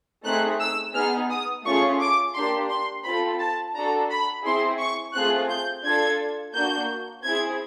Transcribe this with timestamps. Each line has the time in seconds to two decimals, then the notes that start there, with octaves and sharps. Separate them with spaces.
0.25 A3 C4 D#4 G#4 F#6
0.60 E6
0.94 B3 D#4 G#4 F6
1.30 D#6
1.65 A3 C#4 F4 G#4 C#6
2.00 D6
2.34 A#3 D4 G4 C6
2.70 C6
3.04 C4 F4 A4 B5
3.40 A5
3.74 D4 F#4 A4 A#5
4.10 B5
4.44 C4 E4 G#4 C6
4.79 C#6
5.14 A3 C4 F4 G#4 F#6
5.50 G6
5.85 D4 F4 A4 G#6
6.54 A#3 D4 F#4 G6
7.24 C4 E4 G#4 G#6